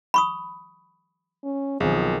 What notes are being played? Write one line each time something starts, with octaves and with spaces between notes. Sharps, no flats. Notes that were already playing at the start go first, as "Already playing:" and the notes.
B5 C#6 D#6
C#4
B1 D#3 F3 C4 G#4